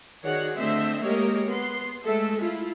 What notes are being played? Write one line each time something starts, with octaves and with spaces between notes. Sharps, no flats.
D#3 F#4 G#4 C#5 D5 F#5
D3 A3 C4 C5 D#5 E5
G#3 A#3 G4 A#4 C#5 D#5
B3 C6
G#3 A3 A4 E5
E4 F4